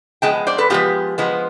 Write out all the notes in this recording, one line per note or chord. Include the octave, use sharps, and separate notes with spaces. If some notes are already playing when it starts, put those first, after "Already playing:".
F3 G#3 B3 G5 A5
C5 D5
A4 B4
F3 G#3 B3 F4 G4
F3 G#3 B3